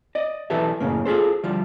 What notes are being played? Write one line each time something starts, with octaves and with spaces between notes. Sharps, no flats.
D5 D#5
B1 E3 G4 A4 B4 E5
F#2 A2 C#3 A#3
F4 G#4 A4 C5
D2 F3 G3